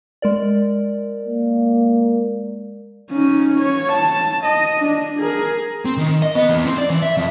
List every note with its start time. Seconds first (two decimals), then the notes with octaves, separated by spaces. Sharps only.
0.22 G#3 A#4 D5
1.26 A#3
3.11 C#4 D#4
3.61 C#5
3.93 A5
4.44 D#5
4.78 D4
5.20 G#4 A#4
5.85 C4
5.97 D#3
6.22 D#5
6.35 B3
6.49 E2
6.66 C4
6.78 D5
6.90 E3
7.02 E5
7.17 F2